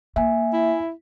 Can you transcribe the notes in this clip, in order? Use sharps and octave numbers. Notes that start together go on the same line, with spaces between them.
A#3 E5 G#5
E4